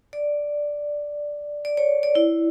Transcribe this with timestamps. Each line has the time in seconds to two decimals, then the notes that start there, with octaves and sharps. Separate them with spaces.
0.13 D5
1.65 D5
1.77 C#5
2.03 D5
2.15 E4